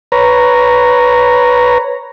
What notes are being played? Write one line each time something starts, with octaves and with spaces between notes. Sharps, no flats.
B4 C#5 A#5